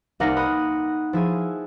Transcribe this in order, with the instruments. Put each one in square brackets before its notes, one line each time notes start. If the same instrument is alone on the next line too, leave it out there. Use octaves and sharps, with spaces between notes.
[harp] C2 A#3 D#4 F#5 F6 A#6
B5 D#6 F#6
F3 E4 G#4